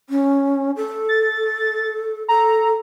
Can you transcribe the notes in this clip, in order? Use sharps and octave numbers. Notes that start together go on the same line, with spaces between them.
C#4
A4
A6
A4 A#5